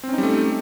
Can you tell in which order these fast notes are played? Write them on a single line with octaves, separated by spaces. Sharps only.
C4 C#4 D#4 G3 A3